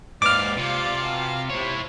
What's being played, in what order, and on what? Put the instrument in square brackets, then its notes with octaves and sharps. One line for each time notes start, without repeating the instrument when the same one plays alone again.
[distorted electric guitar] D#2 G#2 [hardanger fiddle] B4 F5 [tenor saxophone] D5 [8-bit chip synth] D6 F6
[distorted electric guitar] C3 [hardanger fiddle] F4 F5
[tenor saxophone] B2
[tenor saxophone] C3 [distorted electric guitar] E4 C#5 [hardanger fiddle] C5